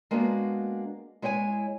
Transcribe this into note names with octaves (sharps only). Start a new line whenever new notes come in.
G#3 A#3 B3 D4 F#4
G#3 E4 C#5 G5 G#5